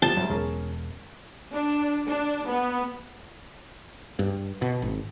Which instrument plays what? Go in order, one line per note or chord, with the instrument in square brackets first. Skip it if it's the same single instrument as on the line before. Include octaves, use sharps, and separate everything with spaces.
[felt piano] A#2 F3 G3 [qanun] A5
[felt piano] C2 G#2 [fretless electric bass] F#3
[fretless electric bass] E1 [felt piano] C#4 G#4 A#4
[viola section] D4
D4
B3
[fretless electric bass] G2
B2
G#1